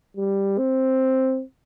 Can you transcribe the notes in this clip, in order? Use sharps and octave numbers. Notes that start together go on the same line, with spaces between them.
G3
C4